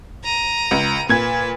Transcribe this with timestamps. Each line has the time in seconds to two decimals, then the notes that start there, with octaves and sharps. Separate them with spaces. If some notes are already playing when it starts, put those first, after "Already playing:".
0.24 A#5 D#7
0.71 C#2
1.09 A#2 B4 G#6